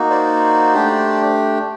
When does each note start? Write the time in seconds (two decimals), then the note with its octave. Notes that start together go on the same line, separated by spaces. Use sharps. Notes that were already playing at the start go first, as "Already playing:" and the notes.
Already playing: A#3 D#4 F#4
0.10 C5 D5
0.74 A3 D4 G4